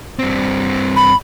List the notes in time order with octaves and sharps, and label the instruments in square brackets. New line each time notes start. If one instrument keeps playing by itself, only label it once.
[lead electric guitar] G2 C4
[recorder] B5